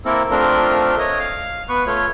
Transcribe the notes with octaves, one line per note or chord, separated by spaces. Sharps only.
A#3 C4 E4 A4 A#4
A3 C4 D4 F4 A#4
C#5 D#5
F5
B3 B4 C#6
A3 F4 C#5